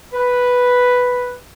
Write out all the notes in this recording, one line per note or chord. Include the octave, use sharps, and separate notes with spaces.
B4